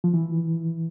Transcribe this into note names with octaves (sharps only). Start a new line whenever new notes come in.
F3
E3